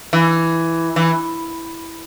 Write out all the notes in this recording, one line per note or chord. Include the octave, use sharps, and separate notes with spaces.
E3
E3